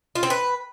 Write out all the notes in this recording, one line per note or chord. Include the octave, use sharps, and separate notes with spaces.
F4
C4
B4